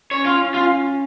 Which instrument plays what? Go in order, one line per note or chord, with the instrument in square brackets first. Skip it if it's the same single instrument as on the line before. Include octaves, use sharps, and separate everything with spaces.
[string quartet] C#4 [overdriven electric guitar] C#5
[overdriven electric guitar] F4
[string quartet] C#4
[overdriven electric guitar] F4